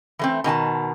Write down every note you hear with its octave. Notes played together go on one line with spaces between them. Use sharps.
E3 A3 C4
B2 D#3 G#5 A5